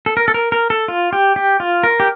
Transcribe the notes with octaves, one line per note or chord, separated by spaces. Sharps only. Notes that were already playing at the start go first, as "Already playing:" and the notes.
A4
A#4
A4
A#4
A#4
A4
F4
G4
G4
F4
A#4
G4